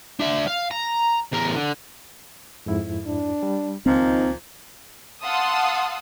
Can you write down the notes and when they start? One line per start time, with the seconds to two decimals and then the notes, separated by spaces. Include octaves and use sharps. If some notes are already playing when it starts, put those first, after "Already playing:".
0.20 D4 E5
0.48 F5
0.71 A#5
1.32 E2 A#4
1.55 D3
2.66 F2 G#2 E4
3.07 D4
3.43 G3
3.86 C#2 A#2 D#3 F3 C4 D#4
5.22 F5 F#5 A5 C6 D#6 E6